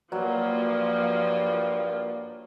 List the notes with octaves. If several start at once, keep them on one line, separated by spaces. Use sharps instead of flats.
G2 F3 F#3 A#3 F4